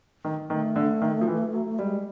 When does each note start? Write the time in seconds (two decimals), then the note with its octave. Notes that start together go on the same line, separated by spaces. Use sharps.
0.24 D#3
0.50 D#3 A3
0.76 D3
1.02 D#3
1.21 F3
1.28 E3
1.53 F#3
1.79 G3 G#3